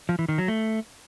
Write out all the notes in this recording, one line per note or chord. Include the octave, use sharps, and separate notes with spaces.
F3
E3
D#3
F#3
A3